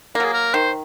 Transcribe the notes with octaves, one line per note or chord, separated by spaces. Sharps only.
F#3 A#3 G#4 A#4
A#4
D#3 C5